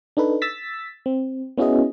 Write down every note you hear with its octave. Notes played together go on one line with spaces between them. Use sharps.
D4 D#4 A4 B4
E6 A6 B6
C4
B3 C#4 E4 F#4 G#4 D#5